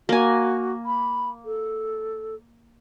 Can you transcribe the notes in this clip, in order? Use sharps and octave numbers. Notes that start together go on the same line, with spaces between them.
A#3 F#4 G#5
B5
A4